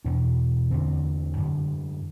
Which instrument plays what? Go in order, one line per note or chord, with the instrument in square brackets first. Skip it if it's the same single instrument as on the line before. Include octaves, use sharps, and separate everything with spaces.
[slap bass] E2 B2 D4
E2 D3 C4
F#2 D3